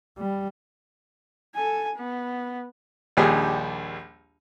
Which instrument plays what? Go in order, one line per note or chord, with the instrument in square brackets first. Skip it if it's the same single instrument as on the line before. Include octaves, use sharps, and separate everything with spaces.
[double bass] G3
[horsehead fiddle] A4 G#5
B3
[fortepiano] A#1 D#2 G3 D4 G4 G#4